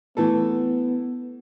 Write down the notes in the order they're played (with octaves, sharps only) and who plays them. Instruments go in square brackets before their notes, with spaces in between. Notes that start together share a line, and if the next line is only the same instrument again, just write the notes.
[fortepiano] E3 A3 A4 [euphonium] B3